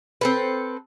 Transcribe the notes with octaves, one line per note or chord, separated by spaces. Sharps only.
C4 A4 B4